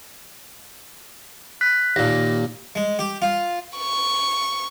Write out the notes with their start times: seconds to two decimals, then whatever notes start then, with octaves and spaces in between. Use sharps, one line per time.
1.61 F#6 B6
1.96 D#2 A#2 A#6
2.75 G#3
2.99 G4
3.22 F4
3.78 C#6